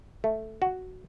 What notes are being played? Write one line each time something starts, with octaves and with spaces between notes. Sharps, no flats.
A3
F#4